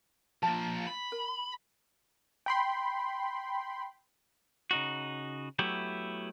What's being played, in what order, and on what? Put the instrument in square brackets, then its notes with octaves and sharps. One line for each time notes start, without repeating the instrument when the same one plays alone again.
[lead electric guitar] F3 A#3 [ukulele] A5
[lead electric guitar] B5
[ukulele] A#4
[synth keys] G5 B5 C6
[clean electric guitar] C#3 D#4 F#4
F#3 A3 B3 E4 G4